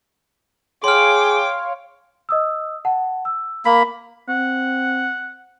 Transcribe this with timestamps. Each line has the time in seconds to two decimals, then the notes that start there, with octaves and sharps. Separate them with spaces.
0.84 G#4 C#5 F5 G5 C6 D6 F6
2.29 D#5 D#6 E6
2.85 F#5 A5
3.25 E6
3.65 A#3 B5 B6
4.29 C4 F#5